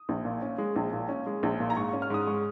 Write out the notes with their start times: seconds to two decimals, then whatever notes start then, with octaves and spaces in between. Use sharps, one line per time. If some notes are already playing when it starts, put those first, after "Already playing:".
Already playing: D#6
0.09 A#1
0.25 A#2
0.42 C#4
0.58 G#3
0.76 A#1
0.93 A#2
1.09 C#4
1.27 G#3
1.43 A#1
1.60 A#2
1.70 A#5
1.76 G#2 C#6
1.89 C#6
1.93 C#4
2.02 F6
2.10 G#2 D#6
2.27 G#3 C#6